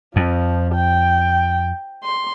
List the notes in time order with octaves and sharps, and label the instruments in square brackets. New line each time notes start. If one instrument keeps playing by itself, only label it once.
[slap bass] F2 [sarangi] F3
[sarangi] G5
C6